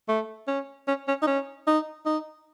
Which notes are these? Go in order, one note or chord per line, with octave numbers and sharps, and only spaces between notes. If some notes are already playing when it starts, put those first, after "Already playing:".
A3
C#4
C#4
C#4
D#4
C#4
D#4
D#4